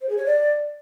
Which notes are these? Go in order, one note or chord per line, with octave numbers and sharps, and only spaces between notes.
C5
G#4
C#5
D5